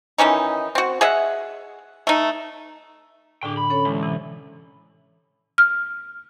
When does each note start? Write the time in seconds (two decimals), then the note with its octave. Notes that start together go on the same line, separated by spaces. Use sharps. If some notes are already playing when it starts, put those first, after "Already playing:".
0.18 D#3 E3 C#4 D#4
0.75 C4 F#4
1.01 G#4 D#5 E5 F#5
2.07 A3 D#4
3.43 A2 D3 D4 G#4 G5
3.57 B5
3.70 C#4 A4 C#5
3.85 C2 E3 G#3
4.03 C3 E3
5.58 F6